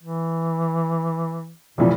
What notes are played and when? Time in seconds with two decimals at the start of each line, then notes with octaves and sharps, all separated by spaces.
0.03 E3
1.78 F1 A#2 E3 F3